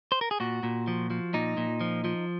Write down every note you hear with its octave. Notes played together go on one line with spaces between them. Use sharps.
C5
A#4
G#4
A#2 F#4
A#2
F3
F3
A#2 D#4
A#2
F3
F3